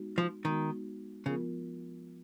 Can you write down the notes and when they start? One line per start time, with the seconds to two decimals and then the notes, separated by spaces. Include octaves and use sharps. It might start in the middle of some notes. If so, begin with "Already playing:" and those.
Already playing: G#3 B3 D#4 F#4
0.18 F3
0.45 D#3 G#3 B3 D#4 F#4
1.26 C#3 F3 B3 F4 A#4